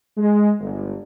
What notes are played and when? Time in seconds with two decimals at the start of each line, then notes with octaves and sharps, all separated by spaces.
0.17 G#3
0.60 G1